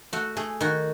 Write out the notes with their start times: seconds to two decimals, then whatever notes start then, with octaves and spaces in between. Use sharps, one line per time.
0.13 A3 F#4
0.37 A3 G#4
0.61 D#3 F#4